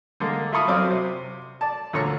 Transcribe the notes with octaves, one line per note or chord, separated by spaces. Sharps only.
D3 G#3 A#3
E4 F4 A4 B5 C#6 D#6
F#2 F#3 C4 D5 F5 D#6
C3
D5 A5
D2 A#2 D3 C#5 A#5 C#6